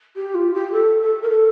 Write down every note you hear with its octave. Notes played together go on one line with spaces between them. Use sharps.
G4
F4
G4
A4
A4
A#4
A4